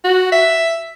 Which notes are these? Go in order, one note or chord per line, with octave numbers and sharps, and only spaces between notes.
F#4
E5